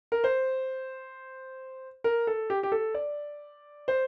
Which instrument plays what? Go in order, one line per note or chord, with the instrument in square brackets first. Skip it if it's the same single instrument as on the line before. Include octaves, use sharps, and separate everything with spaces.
[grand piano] A#4
C5
A#4
A4
G4
G4
A4
D5
C5